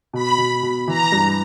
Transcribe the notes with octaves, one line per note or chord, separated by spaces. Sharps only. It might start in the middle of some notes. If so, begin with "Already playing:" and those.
B2 B5
B2
B2
E3 A#5
G2